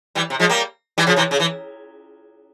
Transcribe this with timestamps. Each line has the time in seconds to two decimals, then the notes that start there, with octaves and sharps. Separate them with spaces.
0.15 E3 G3
0.30 C3
0.40 F3 G#3
0.49 G3 A#3
0.98 E3 G3
1.07 C#3 F3
1.16 C3 E3
1.31 C#3
1.40 E3